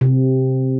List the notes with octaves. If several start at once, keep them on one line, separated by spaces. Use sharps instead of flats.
C3